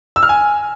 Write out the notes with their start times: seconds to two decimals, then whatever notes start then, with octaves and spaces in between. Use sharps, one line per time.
0.16 E6
0.23 F6
0.29 G#5